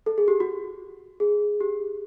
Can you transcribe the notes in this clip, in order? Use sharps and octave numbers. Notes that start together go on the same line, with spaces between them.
A4
G#4
G4
F#4
G#4
G4